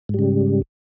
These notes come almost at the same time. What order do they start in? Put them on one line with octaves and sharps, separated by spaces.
G#2 G3 C#3